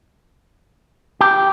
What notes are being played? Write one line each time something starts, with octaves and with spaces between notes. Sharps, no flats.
G4